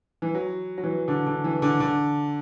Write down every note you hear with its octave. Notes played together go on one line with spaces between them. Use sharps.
E3
F#3
F#3
E3
D3
D3
E3
D3
D3